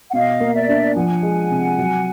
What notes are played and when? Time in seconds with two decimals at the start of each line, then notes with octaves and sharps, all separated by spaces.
0.09 F#5
0.13 B2 D#5 F5
0.40 A#3
0.54 D5 E5
0.69 D4
0.95 F3 F#5 G#5
1.23 G#3
1.50 C3
1.78 F#3